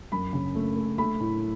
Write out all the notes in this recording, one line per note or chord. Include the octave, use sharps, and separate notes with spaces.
F#2 B5
C#3
A3
A3
A3 B5
A2